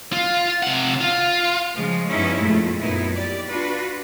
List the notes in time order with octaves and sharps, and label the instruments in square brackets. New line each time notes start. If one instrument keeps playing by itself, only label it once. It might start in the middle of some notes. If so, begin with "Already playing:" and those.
[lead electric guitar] F4
C3 F#5
F4
[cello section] C#3 F3 G#3
G2 F3 B3 C#4 D#4 E4
F2 A#2 G#3 A3
F#2 A#2 B3 D#4 E4
G4 D5
D4 F4 F#4 B4